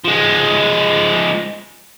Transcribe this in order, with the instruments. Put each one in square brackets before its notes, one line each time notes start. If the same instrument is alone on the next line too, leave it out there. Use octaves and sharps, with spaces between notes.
[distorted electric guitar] F3 G#3